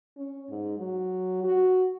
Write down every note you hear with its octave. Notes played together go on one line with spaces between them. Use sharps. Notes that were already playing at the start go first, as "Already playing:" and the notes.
C#4
G#2
F#3
F#4